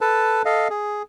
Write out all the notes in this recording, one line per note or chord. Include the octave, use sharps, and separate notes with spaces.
A4 B4 A5
A4 D#5 F5
G#4